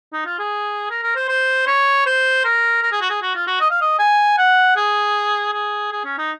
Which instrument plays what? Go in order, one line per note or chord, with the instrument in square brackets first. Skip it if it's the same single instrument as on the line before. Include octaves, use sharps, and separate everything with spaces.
[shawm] D#4
F4
G#4
A#4
A#4
C5
C5
C#5
C5
A#4
A#4
G#4
F#4
G#4
F#4
F4
F#4
D#5
F5
D#5
G#5
F#5
G#4
G#4
G#4
C#4
D#4